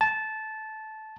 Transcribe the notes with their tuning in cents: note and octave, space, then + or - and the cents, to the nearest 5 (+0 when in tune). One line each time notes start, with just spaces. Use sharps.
A5 -15